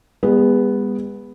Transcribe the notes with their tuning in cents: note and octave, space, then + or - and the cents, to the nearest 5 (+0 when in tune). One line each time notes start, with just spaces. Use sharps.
G#3 -35 B3 +0